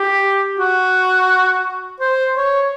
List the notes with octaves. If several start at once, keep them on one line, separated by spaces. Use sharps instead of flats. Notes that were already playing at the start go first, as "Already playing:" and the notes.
Already playing: G4
F#4
C5
C#5